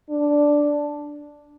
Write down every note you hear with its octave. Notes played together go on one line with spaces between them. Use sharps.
D4